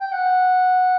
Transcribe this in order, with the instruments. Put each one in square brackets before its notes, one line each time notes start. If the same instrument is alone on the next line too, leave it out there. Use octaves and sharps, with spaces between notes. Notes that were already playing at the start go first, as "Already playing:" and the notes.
[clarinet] G5
F#5